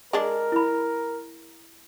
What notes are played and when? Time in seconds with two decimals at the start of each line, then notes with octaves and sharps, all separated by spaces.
0.13 G#3 D4 A#4
0.52 E4 B5